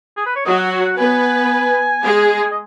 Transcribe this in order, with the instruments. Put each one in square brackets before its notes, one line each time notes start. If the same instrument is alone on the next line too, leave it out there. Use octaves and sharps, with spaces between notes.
[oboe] G#4
B4
C#5
[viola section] F#3 F#4 [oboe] D#5
[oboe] F#5
C#5
F#5
[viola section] B3 B4 [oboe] G#5
[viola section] G#3 G#4
[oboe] D#5